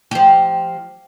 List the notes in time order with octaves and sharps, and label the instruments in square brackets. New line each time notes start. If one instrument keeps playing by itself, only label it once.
[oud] F3 G4